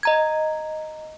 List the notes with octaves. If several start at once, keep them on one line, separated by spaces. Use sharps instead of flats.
D#5 A#5 G#6